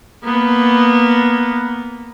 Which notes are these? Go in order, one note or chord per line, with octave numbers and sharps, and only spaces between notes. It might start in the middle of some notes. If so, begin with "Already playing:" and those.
A#3 B3